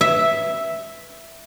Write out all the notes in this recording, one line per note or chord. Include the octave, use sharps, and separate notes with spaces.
E5